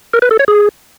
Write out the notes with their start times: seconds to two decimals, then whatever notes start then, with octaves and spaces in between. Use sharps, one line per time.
0.14 A#4
0.22 B4
0.31 A4
0.39 C#5
0.48 G#4